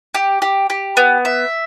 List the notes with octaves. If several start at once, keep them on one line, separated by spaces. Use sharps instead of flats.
G4
G4
G4
B3
E5